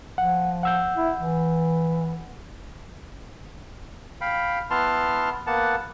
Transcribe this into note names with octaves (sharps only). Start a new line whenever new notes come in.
F3 F#5
F#5 E6 G6
E4
E3
F5 G5 B5
B3 E4 A5 C6 F6
A#3 B3 F#5 A5